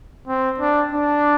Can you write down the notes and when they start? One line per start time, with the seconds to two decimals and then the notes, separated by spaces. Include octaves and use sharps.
0.27 C4
0.59 D4
0.92 D4